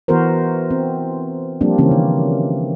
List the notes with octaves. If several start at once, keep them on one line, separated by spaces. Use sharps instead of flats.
E3 B3 F#4 A#4 C5
C4
F3 G3 A#3 C4 D4
C#3 E3 A#3 C4 C#4
D#3